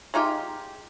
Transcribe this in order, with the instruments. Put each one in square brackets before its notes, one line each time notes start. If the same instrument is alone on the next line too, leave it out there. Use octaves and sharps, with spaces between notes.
[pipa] G#3 D#4 F4 G4